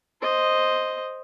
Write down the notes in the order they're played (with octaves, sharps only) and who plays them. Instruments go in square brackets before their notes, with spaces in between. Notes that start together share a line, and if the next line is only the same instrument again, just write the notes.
[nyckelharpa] C5 D#5